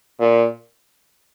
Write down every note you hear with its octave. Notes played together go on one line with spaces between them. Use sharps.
A#2